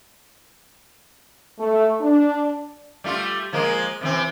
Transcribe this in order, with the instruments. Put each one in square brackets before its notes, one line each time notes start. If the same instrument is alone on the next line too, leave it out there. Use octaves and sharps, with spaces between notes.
[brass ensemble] A3
D4
[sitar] G3 A3 F4
F3 G#3 A#3
C3 E3 C4